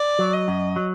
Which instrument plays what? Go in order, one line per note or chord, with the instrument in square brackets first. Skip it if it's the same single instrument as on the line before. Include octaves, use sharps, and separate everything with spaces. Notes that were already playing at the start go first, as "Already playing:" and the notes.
Already playing: [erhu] D5
[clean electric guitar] F#3
[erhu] D#5
[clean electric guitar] F#2
F#3